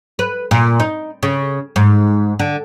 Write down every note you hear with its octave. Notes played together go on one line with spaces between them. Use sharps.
B4
A#2
D#4
C#3
G#2
D3